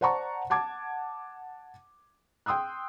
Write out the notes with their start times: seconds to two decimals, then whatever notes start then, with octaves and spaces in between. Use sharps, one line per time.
0.01 C5 D5 F#5 A5 A#5 C#6
0.50 F#5 A5 D6 G#6
2.46 G5 C6 D#6 E6 F#6